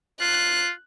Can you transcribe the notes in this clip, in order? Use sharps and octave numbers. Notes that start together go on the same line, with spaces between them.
F4 F#6